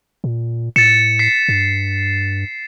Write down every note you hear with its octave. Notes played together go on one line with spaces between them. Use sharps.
A#2
A2 A6 C#7 E7
B6 C7
G2